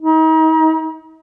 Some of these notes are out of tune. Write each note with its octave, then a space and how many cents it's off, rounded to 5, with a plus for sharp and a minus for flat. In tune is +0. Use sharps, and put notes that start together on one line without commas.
D#4 +35